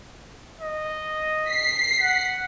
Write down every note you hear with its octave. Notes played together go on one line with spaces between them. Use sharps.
D#5
B6 C7
F#5